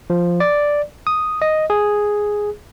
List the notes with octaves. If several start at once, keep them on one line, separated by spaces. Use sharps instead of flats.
F3
D5
D#6
D#5
G#4